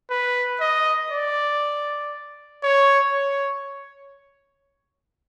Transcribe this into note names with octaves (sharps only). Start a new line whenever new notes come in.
B4
D#5
D5
C#5
C#5